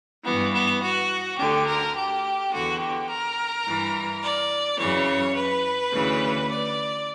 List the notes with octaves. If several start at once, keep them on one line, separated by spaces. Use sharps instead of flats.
G2 E3 B3
B3
F#4
D2 D3 G4
A#4
G4
E2 D3 F#4
G4
A#4
G2 E3
D5
F#2 C#3 E3 C#5
B4
D2 C#3 E3
D5